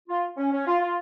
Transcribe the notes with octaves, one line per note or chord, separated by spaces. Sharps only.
F4
C#4
C#4
F4
F4